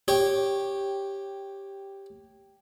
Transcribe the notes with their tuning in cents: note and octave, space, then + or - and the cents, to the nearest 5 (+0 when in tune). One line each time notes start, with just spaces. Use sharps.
G4 +0 C#5 -15